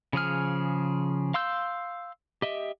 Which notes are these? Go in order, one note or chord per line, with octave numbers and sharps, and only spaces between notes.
C#3 F3 G#4 F6
F5 C6 E6 G6
G4 D#5 E5